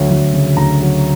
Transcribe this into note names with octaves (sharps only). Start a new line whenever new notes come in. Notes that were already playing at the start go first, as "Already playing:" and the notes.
Already playing: D2 F#3
D2
C#3
D2 A#5
F#3